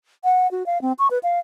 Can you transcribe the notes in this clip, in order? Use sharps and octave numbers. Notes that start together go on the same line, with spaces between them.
F#5
F#4
F5
C4
C#6
B4
F5